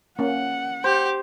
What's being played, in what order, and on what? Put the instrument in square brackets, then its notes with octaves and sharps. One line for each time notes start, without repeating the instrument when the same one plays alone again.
[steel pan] A#3 C#4 [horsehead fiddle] F#5
[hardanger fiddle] G4 [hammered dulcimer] C5